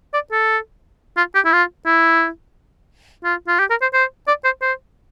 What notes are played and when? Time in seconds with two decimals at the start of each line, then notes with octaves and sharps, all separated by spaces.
0.14 D5
0.32 A4
1.17 F4
1.35 G4
1.45 E4
1.53 F4
1.86 E4
3.24 F4
3.48 F4
3.59 G4
3.70 A#4
3.82 C5
3.94 C5
4.27 D5
4.44 C5
4.62 C5